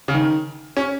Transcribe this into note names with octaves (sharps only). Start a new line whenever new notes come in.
C#3
D#3
C#4